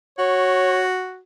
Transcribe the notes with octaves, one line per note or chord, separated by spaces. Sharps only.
F#4 C#5